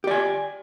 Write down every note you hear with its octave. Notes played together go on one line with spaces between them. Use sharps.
G4 D5 G#5